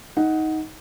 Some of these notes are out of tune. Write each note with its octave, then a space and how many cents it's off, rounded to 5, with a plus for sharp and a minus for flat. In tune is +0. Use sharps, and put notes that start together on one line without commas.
D#4 +15 F#5 +0